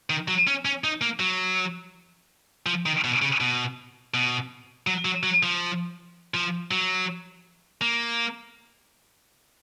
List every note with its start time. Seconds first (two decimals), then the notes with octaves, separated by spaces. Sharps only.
0.10 D#3
0.28 F#3
0.47 C#4
0.65 C#4
0.84 D#4
1.01 A#3
1.20 F#3
2.66 F3
2.86 D#3
3.04 B2
3.22 C#3
3.40 B2
4.14 B2
4.87 F#3
5.05 F#3
5.23 F#3
5.43 F3
6.34 F3
6.71 F#3
7.81 A#3